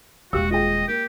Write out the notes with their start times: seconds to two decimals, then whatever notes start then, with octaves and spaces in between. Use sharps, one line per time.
0.33 D#1 G#3 F#4 G4 F5 E6
0.51 F4 G#4 D#5 G5
0.88 A#3 G4